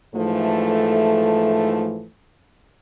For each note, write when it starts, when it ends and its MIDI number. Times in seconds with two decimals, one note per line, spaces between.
0.15 2.07 44
0.15 2.07 52
0.15 2.07 53
0.15 2.07 57